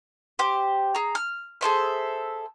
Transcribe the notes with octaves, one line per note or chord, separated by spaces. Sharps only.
G4 C5
G#4 A#5
F6
G#4 A4 C5 E5